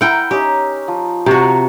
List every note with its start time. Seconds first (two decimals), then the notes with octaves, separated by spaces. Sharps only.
0.01 E4 A#4 F#5 G5
0.31 C#4 D#4 G4
0.88 F3
1.26 C3 F#4 A#5 C#6